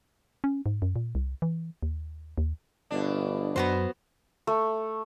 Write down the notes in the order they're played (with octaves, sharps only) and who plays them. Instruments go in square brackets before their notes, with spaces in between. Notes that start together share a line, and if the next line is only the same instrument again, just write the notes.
[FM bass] C#4
G#2
F#2
A#2
C2
E3
D#2
D#2
[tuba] G1 [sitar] B2 D4
[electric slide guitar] F#2 F#3 [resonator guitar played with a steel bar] B3 F#4 C5
[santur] A3